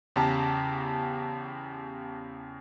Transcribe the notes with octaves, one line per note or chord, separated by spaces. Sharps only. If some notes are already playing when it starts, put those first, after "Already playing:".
E2 C#3 G4 A5 A#5